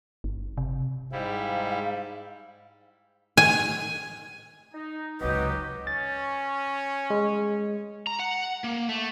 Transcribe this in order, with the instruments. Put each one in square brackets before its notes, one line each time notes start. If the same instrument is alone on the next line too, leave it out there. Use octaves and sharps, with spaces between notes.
[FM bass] G1
C3
[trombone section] G#2 [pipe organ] G3 E4 [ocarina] F5
[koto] G#5
[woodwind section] D#4
[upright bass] G#1 C#2 [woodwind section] F#3 G4 [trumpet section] D#4 F#4 D#5 [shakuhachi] B4
[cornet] C#4 [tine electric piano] A6
[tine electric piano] G#3
[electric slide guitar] A#5
F#5
A#3
A3